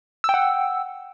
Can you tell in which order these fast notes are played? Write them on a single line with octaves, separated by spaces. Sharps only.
E6 G5 F#5